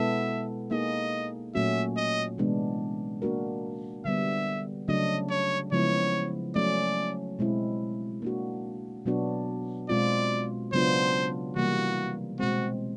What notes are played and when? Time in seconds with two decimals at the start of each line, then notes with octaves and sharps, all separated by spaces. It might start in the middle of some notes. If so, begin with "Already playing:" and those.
Already playing: B2 G#3 B3 E4 A4 E5
0.71 A#3 D#4 G#4 D#5
1.55 A#2 F#3 A3 C#4 F#4 E5
1.97 D#5
2.38 C3 E3 G#3 B3 D4
3.22 A#3 D4 F#4 A#4
4.05 D3 G3 B3 E5
4.88 C#3 F#3 A3 D4 D#5
5.30 C#5
5.72 C#3 F3 G#3 B3 E4 C#5
6.55 F#3 A3 C#4 D5
7.39 B2 G#3 C4 E4
8.22 A#3 D4 F#4
9.06 B2 F#3 B3 D4 F#4
9.89 B2 G#3 C4 F4 D5
10.72 C#3 F#3 B3 D4 F4 C5
11.56 C3 E3 G3 A#3 F#4
12.40 B2 G#3 C4 F#4